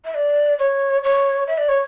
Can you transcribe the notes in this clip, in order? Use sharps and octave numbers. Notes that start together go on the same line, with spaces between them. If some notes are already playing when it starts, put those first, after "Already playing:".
E5
D5
C#5
C#5
E5
D5
C#5